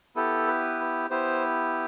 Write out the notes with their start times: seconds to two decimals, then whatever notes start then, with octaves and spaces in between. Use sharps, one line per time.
0.16 B3 E4 G4 A4
0.47 B4
1.10 B3 E4 G4 C5